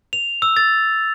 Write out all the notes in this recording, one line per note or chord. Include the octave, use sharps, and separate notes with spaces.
F7
E6
A6